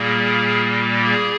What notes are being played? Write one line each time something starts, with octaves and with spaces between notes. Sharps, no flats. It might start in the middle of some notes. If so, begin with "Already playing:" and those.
Already playing: A#2 G3 A#3 G#4
G#4